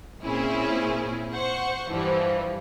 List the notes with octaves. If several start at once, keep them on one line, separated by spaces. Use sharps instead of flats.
A#2 C4 C#4 E4 G#4
C5 F#5 C#6
G2 E3 F3 G3